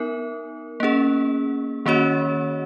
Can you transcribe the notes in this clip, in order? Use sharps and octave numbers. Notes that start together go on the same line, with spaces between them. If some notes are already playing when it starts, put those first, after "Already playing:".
Already playing: B3 D#4 A#4
A#3 C#4 G#4
D#3 A#3 C#4 F#4 C#5